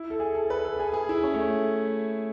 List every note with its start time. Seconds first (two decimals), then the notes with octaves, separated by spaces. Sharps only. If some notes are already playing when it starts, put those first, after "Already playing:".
Already playing: E4
0.10 A4
0.20 G#4
0.35 A4
0.50 B4
0.65 A4
0.79 G#4
0.93 G#4
1.09 E4
1.23 C#4
1.34 A3